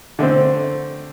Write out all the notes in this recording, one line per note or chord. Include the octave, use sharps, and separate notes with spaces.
D3 A3 C4